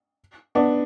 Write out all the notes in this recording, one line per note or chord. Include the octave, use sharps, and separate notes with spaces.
B3 D4